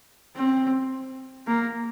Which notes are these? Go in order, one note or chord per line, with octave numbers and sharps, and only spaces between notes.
C4
A#3